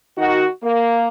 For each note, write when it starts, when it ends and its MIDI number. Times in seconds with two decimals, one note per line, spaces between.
0.17 0.46 51
0.17 0.46 63
0.17 0.46 66
0.63 1.08 58